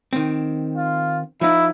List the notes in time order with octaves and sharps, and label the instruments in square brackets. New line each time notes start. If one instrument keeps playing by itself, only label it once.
[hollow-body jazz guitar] D#3 C4
[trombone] F4
[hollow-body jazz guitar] F3 D#4 [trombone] E4